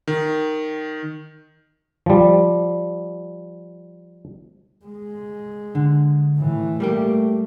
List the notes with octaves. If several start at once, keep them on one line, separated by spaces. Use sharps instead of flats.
D#3
F3 G3
G#3
D3
A2 E3
G3 A3 A#3 G4